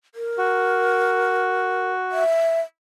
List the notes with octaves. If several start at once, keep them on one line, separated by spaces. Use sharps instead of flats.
A#4
F#4
E5